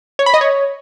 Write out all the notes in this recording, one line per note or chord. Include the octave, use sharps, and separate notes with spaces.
C#5
B5
D#5
C#5